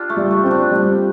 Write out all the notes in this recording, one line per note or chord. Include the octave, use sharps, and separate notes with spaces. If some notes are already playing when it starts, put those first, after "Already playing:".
Already playing: D4 F4 G4
A3
G3
A3
C4
D4
G3